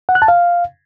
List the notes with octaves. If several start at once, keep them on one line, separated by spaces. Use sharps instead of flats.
F#5
F#6
A5
F5